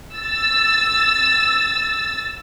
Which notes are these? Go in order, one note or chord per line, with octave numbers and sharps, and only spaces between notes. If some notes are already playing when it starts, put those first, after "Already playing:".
E6 A6